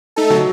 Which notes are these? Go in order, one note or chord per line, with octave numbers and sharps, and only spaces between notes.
A3 D#4 A4
F#3